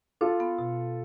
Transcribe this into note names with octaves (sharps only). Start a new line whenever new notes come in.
D4 F4 A4
B3
B2